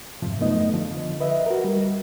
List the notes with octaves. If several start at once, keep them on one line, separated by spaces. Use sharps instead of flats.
F2 G#2 C3 F3
F#2 A3 B3 D#4 D#5
D3 F3
B4 D#5 E5
F#4 A#4
G3